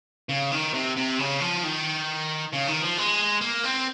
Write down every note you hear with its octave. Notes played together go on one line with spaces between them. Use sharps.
C#3
D#3
C3
C3
C#3
F3
D#3
C#3
D#3
F3
G#3
A#3
C4